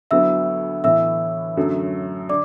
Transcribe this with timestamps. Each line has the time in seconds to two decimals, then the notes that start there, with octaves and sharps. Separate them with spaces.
0.11 D2 D3 F#3 B3 E4 E5 E6
0.83 A2 E3 B3 E4 E5 E6
1.57 F#2 D3 F#3 A3
2.29 D3 D5 D6